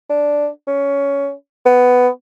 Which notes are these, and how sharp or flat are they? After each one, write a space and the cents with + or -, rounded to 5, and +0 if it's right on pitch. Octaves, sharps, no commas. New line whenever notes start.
D4 -5
C#4 +15
B3 +10